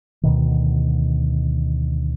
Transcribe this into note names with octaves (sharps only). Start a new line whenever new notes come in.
D2 B2 D#3